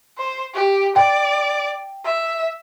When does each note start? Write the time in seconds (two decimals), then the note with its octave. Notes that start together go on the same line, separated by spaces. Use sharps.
0.18 C5
0.54 G4
0.96 D5 G5
2.05 E5